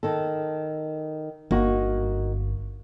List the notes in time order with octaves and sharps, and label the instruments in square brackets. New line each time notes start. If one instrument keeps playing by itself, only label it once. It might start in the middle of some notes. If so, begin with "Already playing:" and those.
[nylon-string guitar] D#3 A4
[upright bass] G1 [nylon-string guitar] A#3 D#4 F#4